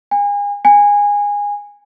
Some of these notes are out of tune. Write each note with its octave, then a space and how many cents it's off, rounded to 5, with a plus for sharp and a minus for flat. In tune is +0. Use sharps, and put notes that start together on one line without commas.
G#5 -35
G#5 -20